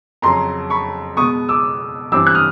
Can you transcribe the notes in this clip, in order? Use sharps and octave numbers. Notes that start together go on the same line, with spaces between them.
F2 C#3 F#3 A#5 C6
B5 C#6
B2 G#3 B3 C#6 D#6
D6 E6
G2 E3 G3 C4 D6 E6
F#6
D#6 F6